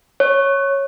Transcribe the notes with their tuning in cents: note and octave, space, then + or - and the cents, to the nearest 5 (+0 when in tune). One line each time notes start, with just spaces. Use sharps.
C#5 -5